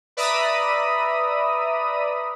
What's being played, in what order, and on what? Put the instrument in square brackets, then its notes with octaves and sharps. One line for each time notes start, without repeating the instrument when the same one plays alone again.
[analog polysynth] B4 D5 E5 A#5 B5 D#6